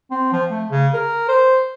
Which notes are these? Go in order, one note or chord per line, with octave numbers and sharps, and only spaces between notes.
C4
F3
A3
C#3
A#4
C5